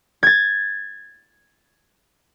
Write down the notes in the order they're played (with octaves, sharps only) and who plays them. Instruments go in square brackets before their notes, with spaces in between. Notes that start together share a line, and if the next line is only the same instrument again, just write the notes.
[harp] G#6 A6